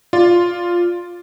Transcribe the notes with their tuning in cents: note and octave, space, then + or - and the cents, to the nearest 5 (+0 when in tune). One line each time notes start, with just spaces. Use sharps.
F4 +0 D5 +0